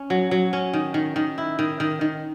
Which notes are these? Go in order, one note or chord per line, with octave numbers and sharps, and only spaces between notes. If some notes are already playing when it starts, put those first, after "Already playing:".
Already playing: C#4
F#3
F#3
C#4
D#3
D#3
D#3
E4
D#3
D#3
D#3